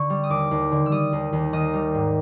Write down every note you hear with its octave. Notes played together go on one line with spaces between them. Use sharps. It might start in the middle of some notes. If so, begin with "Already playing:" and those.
Already playing: D3 C#6
G3
D#6
D#2 D6
D#2
D3
E6
G3 D#6
D#2
D#2
D#3 D#6
G3
G#2